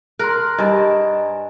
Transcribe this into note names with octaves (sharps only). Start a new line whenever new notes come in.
A#4 C6 F#6
G2 D#5 G#5 A#5